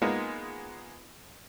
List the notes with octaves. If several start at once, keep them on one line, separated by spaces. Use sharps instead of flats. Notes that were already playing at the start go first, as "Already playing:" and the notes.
G#3 A#3 B3 D#4 F4